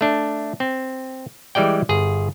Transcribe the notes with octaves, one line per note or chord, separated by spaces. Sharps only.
A3 D4
C4
E3 G3 G#3 D5 G5
G1 G#4